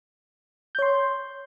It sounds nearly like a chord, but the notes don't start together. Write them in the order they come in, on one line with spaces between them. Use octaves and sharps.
G6 C#5 C6